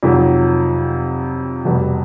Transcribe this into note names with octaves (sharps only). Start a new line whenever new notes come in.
F2 C3 D#3 F#3
F1 E2 B2 G3